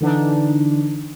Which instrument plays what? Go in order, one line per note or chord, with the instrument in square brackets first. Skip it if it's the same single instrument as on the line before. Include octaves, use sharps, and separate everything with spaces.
[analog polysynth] D3 E3 D4 D#4